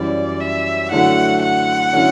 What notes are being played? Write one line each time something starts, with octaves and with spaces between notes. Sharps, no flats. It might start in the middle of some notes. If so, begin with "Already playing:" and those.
Already playing: F#2 E3 G3 D5
E5
D3 F#3 A3 E4 F#5
F#5
D3 F#3 C#4 E4